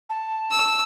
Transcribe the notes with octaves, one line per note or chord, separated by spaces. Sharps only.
A5
E6